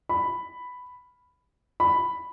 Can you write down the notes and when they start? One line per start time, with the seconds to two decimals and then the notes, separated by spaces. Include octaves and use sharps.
0.09 B5
1.80 B5